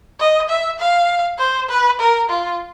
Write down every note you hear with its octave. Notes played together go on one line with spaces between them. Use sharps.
D#5
E5
F5
C5
B4
A#4
F4